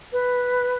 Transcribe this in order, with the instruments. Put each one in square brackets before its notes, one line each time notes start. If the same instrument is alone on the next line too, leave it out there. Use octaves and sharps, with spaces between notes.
[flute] B4